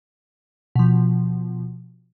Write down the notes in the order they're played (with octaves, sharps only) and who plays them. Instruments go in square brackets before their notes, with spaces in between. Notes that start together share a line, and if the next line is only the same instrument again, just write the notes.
[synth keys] B2 F3